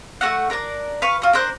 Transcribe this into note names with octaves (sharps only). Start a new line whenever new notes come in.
A3 B3 F#4 F#5
D4 A#4 C#5 D5
B4 F5 C#6
F4 F#4
D4 A#4 C5 F#6